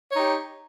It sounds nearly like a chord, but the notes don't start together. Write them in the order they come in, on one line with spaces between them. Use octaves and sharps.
C#5 D#4 G4